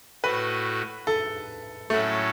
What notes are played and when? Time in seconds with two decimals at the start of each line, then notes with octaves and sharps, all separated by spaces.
0.24 A2 A3 F#4 B4
1.07 A4
1.90 A2 F#3 A3 C#4 A4 C#5